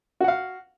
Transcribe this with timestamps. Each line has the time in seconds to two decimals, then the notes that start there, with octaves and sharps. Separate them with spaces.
0.20 F#4
0.24 F#5
0.28 F5